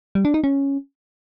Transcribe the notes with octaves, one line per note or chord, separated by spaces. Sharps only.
G3
D4
D#4
C#4